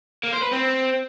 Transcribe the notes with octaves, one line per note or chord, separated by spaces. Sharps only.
A#3
C5
B4
C4